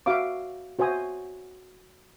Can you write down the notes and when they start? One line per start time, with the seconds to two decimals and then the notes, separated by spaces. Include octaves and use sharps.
0.06 F#4 E5 F5 D6
0.79 F#4 C5 E5 G#5 D#6